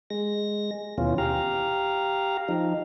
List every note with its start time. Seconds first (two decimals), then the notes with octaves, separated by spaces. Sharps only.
0.10 G#3 A#6
0.98 D#2 B2 E3 C#4 F4
1.18 G4 F5 A#5
2.48 F3 D#4